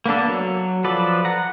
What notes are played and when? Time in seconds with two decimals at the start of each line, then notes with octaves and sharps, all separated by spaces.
0.06 A#3 B3 D4 A4
0.28 F#3
0.84 F3 A4 B4 D5
1.25 F#5 A#5